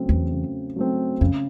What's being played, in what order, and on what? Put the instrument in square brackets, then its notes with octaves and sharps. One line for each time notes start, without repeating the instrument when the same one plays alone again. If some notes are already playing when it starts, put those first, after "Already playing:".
Already playing: [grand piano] C#3 F#3 A3 C4
[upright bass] E2
[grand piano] C#3
F#3 A3 C4
[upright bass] F2 [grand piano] C#3